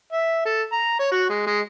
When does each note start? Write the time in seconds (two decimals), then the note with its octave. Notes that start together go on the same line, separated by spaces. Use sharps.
0.13 E5
0.45 A4
0.72 A#5
0.99 C#5
1.12 F#4
1.30 G#3
1.46 G#3